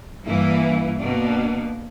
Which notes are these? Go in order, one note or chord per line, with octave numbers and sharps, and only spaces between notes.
G2 E3 A#3 E4
B2 A#3 D4